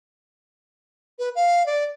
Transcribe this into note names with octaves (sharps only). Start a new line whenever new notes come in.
B4
F5
D5